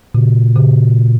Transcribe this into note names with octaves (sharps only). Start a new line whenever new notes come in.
A#2 C#3
C#3